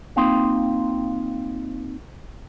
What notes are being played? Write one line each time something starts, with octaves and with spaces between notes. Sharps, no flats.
A#3 C4 D#4 F4 F5 G5